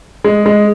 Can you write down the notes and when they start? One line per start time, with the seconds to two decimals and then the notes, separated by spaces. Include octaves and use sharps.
0.24 G#3
0.46 G#3